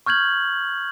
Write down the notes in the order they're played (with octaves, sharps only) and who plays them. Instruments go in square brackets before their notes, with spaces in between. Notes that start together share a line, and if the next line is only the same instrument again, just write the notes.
[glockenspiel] C#6 F6 G6 G#6 F#7